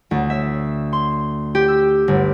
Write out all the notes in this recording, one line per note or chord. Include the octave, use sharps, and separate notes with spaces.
D2
E5
C6
G4
E6
G1